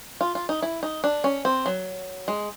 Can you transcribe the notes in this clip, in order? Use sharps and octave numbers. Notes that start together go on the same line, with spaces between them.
F4
F4
D#4
E4
D#4
D4
C#4
C4
F#3
G#3